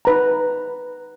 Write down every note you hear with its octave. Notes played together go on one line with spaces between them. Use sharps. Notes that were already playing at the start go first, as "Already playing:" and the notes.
D#4 B4 A#5